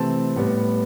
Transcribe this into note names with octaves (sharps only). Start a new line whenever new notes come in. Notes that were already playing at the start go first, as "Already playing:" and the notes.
Already playing: C3 E3 A3 C4 A5
A2 G3 B3